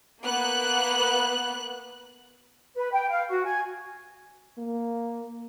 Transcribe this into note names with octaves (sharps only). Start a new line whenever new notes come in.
A#3 B3 F#6
B4
G5
F5
F#4
G#5
A#3